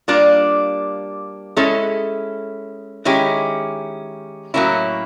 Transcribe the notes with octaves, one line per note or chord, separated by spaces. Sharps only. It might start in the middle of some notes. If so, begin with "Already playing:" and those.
G3 A#3 D4 F4
G#3 C#4 E4 A4
D#3 G#3 C#4 E4 G4
A2 F#3 A#3 C#4 E4